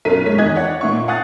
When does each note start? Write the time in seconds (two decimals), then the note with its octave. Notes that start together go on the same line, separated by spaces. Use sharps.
0.05 B1 F#2 A#4 B6 D#7
0.26 G#3 C#5 B6
0.38 E2 D#3 D#5 G#5 F#6 G#6
0.55 C#5 D5 F#5
0.81 A#2 D#4 E5 C#6
1.08 F5 F#5 G#5 D#6 F#6 A6